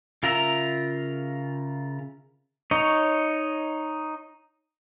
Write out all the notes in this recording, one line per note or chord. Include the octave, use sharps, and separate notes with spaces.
C#3 F4 A#4 E5 A#5
D#4 C#5 D#5